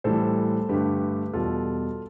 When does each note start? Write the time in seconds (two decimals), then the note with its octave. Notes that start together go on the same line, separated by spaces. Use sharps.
0.04 A2 E3 G3 A4 C5
0.69 G2 D3 A3 G4 B4
1.34 E2 B2 G3 F4 A4